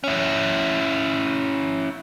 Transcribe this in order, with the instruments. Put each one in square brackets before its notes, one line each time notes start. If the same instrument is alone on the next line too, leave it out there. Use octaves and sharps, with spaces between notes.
[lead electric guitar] C#4 E4